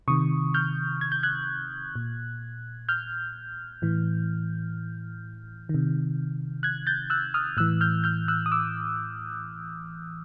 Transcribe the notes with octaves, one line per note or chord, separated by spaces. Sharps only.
C3 D#3 C#6 D#6
F6 G6
G#6
G6
F#6 G#6
A#2
F6 G6
A2 E3
D#3
C3
F#6 G#6
G6 A6
E6 F#6
D#6 F6
A2 E3 E6 F#6
F6 G6
F6 G6
E6 F#6
D#6
D6 E6